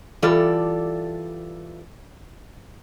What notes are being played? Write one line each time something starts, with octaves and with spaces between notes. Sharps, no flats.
E3 G3 F4 A4 D5